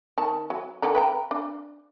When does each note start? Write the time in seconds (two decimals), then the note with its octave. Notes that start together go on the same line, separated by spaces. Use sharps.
0.18 D#3 A5
0.50 F#3
0.82 D3 D#3 A#5
0.95 B4 G5 A#5
1.31 D4